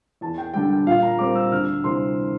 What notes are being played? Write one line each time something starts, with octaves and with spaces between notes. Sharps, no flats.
E2 A5
G5
D3 G3 G5
G5
A#2 F5
A#5
G3 C4 D6
E6
D2 F6
C3 E3 G3 C4 C6